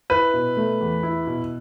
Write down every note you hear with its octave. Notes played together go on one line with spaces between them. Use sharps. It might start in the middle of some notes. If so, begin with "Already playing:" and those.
E4 B4
B2
A3
E2
E4
B2